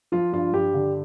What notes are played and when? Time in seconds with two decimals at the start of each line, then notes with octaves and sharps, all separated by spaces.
0.12 F3 F4
0.33 G2 F4
0.53 G2 G4
0.74 D3